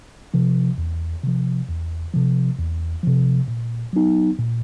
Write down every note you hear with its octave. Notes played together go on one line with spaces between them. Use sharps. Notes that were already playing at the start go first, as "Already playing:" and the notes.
C3 F3
E2
C3 F3
E2
C3 F3
E2
C3 F3
A#2
F#3 B3 D#4
A#2